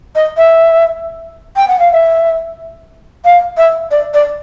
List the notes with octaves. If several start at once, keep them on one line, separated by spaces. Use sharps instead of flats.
D#5
E5
G5
F#5
F5
E5
F5
E5
D5
D5